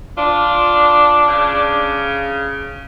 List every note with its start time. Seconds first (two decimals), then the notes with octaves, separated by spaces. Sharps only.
0.18 D4 F4
1.28 C#3